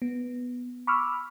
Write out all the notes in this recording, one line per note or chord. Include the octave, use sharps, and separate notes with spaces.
B3
B5 C#6 D6 E6 F6